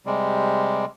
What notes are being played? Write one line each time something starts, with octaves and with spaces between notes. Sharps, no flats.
C3 G3 G#3